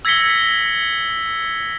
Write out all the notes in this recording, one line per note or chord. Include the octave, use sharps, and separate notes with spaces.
E6 G#6 A#6 B6 C#7 G7